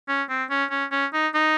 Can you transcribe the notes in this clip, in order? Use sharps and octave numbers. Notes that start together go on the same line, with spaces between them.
C#4
C4
C#4
C#4
C#4
D#4
D#4